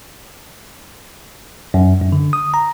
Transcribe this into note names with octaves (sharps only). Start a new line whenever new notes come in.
F#2
F#2
D3
D#6
A#5